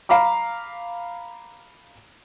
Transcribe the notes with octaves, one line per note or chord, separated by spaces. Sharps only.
F5 A#5 B5 D6